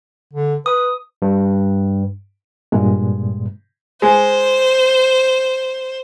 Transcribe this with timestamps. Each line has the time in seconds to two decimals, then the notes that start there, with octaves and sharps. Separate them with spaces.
0.33 D3
0.66 B4 D#6
1.22 G2
2.72 G2 A#2 G#3
4.02 G#3 C5